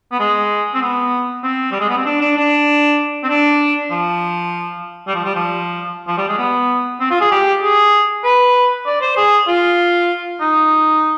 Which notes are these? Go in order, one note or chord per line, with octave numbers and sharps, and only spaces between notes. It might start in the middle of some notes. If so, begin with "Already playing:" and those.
B3
G#3
C4
B3
C4
G3
G#3
B3
C4
D4
D4
D4
C4
D4
F3
G3
F3
G3
F3
F3
G3
G#3
B3
C4
F4
G#4
G4
G#4
B4
D5
C5
G#4
F4
D#4